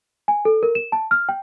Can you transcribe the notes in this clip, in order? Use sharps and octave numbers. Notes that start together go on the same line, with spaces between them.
G#5
A4
A#4
E7
A5
F6
G5